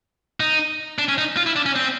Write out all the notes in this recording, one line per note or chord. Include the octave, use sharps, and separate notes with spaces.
D#4
D4
C#4
D#4
F4
E4
D4
C#4
C4